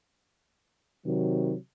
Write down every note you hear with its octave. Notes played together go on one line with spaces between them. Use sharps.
C3 D#3 F#3